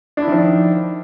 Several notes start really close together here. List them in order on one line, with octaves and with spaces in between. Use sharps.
D4 E4 D#3 F3